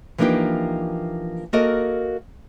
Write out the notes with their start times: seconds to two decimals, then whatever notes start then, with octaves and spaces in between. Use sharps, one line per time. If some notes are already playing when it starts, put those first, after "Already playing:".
0.18 E3 F3 A#3 D4 D#4 G4
1.53 A#3 F#4 A4 A#4 D#5